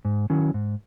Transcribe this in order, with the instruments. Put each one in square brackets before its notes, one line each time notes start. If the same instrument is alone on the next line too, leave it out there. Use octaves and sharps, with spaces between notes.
[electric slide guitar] G#2
D#3 F#3 C#4 E4
G#2